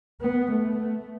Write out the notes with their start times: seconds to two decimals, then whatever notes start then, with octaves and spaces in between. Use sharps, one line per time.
0.21 B3
0.52 A3